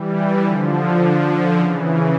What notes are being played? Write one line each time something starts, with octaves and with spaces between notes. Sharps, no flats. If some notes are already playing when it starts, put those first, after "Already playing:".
Already playing: E3 G3
D3 F3
C#3 E3